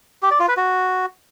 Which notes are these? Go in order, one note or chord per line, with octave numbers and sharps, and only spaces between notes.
G4
D5
F4
B4
F#4